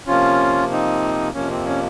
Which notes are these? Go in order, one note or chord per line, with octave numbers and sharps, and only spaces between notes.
C3 F3 A#3 C#4 F4
C4 D#4
F2 C3 F3 A#3 C#4
C4
C#4